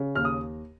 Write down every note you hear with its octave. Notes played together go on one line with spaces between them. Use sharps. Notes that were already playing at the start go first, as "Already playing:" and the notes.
Already playing: C#3
D#2 F6
D#6